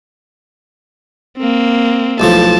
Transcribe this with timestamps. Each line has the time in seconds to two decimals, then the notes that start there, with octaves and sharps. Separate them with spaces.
1.38 A#3 C4
2.20 B1 A2 F3 A5